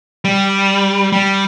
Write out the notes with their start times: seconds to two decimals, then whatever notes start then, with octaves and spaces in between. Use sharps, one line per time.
0.25 G3
1.12 G3